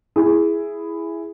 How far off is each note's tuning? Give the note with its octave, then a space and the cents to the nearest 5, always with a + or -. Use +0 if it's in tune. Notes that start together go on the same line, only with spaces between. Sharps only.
E4 +10 G#4 +0